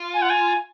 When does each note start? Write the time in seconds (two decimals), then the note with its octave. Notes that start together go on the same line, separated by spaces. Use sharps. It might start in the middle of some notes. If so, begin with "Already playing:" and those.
Already playing: F4
0.14 G#5
0.22 F#5
0.30 G#5